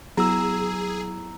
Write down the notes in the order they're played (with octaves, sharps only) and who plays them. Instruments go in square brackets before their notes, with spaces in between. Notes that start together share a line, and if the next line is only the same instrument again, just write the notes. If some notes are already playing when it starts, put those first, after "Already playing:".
[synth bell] F#3 B3 E4 [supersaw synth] G#4 [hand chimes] A#5 E6